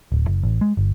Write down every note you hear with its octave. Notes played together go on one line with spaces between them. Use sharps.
D1
F#1
A1
G#3
G1